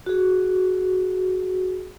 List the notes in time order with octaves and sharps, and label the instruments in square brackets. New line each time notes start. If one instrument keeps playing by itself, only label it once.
[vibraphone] F#4 G#4